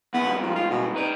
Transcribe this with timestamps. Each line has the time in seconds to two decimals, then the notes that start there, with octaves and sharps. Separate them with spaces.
0.14 E2 B3
0.25 C#2 G2
0.43 F3
0.55 F4
0.70 B2
0.96 D#4 B4 D5